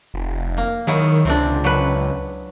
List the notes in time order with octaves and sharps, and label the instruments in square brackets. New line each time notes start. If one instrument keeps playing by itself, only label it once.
[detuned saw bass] F1
[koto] A#3
[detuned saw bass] D#3 [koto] F#3 E4 G#4
[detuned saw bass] C#2 [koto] C3 C4 D4
[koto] F#3 B4